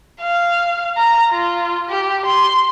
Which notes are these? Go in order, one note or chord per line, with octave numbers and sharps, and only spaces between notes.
F5
A#5
F4
G4
C6